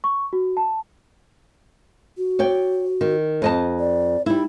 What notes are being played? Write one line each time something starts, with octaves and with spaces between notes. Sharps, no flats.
C#6
F#4
A5
F#4
C#5 D5 G5
D#3
F2 D#5 A5
D5
G3 D#4 E4